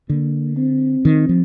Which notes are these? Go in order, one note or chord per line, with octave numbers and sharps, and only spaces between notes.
D3 A#3
C4
D#3
F3